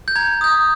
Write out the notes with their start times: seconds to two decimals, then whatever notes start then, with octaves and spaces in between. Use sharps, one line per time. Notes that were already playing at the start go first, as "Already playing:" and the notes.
0.08 G6
0.16 A#5 G#6
0.41 D#6 G6